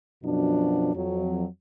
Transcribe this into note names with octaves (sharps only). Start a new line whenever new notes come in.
F#2 B2 F3 F#3 D4
F2 F#3